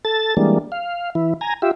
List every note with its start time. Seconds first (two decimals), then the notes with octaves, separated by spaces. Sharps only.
0.05 A4 A6
0.37 E3 G3 G#3 A#3 D4
0.72 F5
1.15 E3 E4
1.41 G#5 A#5
1.62 F4 G4 E5